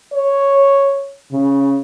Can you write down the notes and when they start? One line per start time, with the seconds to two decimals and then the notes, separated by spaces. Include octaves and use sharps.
0.13 C#5
1.32 C#3